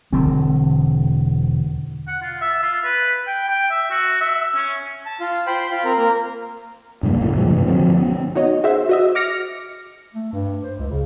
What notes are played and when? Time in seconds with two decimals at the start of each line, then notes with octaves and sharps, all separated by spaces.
0.13 E1 D3 F#3 C4
2.08 F#5
2.22 F4
2.41 E5
2.63 F4
2.85 B4
3.27 G5
3.48 G5
3.71 E5
3.91 F#4
4.21 E5
4.55 C#4
5.06 A5
5.20 F4
5.47 C5 G5 B5 C6
5.71 F4
5.84 C4 A#4
5.98 A#3 A#4
7.03 G2 C#3 G3 A#3
7.21 F#2 A2 C#3
7.35 A#2 F3 G3 G#3
7.49 G2 C3 E3 A3
7.66 D3 F3 F#3 C4
7.98 B3 C#4
8.35 D#4 F#4 C#5 D#5
8.64 F#4 G#4 C5 E5
8.89 F#4 D#5 E5
9.15 D6 F6 A#6 C#7
10.15 A3
10.33 G2
10.64 C5
10.79 C#2
10.91 C#3